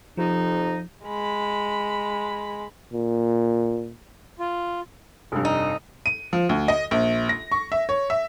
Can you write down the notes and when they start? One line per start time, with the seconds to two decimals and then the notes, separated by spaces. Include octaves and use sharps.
0.17 F2 C3 F3 D#4
1.06 G#3 B5
2.93 A#2
4.39 F4
5.32 F1 G2
5.45 D#4
6.06 D#7
6.33 F3
6.49 D2
6.68 D#5
6.91 A#1
7.29 A#6
7.52 C#6
7.72 E5
7.89 C#5
8.10 E5